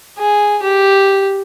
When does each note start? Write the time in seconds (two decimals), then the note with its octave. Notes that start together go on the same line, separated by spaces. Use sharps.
0.18 G#4
0.63 G4